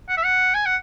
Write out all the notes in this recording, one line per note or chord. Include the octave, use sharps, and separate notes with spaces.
F#5
E5
F#5
G#5
F#5